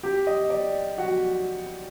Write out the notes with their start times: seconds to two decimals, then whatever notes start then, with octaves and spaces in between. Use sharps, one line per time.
0.03 G4 G5
0.27 D#5
0.50 D5
0.98 F#4 F#5